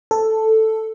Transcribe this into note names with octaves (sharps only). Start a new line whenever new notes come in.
A4